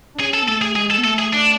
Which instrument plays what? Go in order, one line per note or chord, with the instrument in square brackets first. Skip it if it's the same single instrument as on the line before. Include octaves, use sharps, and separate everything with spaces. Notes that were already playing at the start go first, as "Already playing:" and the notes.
[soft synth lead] D4
[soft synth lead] C#4 [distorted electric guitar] G#4
[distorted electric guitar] A4
[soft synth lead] B3
[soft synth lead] A3 [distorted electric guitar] A4
[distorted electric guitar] G#4
[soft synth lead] G#3 [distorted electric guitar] G#4
[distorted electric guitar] A4
[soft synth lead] B3
[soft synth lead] A3 [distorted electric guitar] A4
[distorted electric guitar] G#4
D4